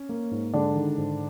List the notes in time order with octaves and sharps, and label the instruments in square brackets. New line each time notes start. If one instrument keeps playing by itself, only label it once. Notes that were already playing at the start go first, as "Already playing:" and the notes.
Already playing: [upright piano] C#4
A#3
G#2
D3 G#3 D4
D#3
G#2